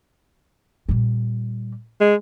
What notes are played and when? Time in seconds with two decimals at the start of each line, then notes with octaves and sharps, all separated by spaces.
0.89 A#2 G3
2.01 G#3